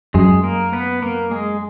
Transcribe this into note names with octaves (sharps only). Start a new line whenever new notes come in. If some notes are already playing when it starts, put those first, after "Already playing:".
F#2 G#3 G#4
A#3 A#4
B3 B4
A#3 A#4
G#3 G#4